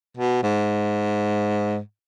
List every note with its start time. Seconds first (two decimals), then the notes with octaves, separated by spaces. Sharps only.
0.17 B2
0.43 G#2